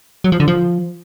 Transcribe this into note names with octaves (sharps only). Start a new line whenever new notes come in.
F#3
F3
D3
F3